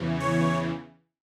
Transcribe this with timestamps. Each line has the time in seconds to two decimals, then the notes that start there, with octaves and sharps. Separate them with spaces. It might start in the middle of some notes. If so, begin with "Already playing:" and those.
Already playing: E2 C#3 E3
0.20 C#5